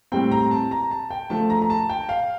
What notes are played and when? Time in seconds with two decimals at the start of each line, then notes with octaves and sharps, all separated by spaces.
0.12 A2 G3 C4 G5
0.31 A#5
0.51 A5
0.71 A#5
0.91 A5
1.10 G5
1.30 D3 F3 A3 A5
1.50 A#5
1.62 A#5
1.70 A5
1.89 G5
2.09 F5